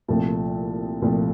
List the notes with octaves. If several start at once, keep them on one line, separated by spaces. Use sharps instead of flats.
C2 A#2 F3 A3
C2 A#2 F3 A3